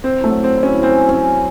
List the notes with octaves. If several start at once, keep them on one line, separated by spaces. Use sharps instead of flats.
C4 E4
A3
F#3
C4
E4
C#4
C4 C#4
C#4